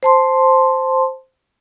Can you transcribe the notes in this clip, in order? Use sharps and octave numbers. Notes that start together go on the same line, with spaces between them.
C5 A5 C6